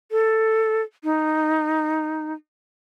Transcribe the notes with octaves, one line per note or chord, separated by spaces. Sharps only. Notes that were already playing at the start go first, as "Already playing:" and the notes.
A4
D#4